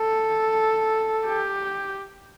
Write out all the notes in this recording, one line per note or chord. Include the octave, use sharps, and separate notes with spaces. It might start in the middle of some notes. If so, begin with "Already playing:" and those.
Already playing: A4
G4